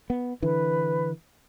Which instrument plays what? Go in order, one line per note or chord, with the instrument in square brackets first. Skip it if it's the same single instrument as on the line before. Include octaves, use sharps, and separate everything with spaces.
[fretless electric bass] B3
[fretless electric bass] D3 E3 [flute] B4